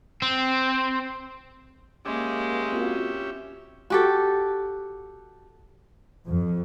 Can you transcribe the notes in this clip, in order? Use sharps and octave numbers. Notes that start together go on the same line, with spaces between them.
C4
G#3 A#3 C#4 G4 E5 D6
C4 F4 F#4
F#4 G4 A4
F2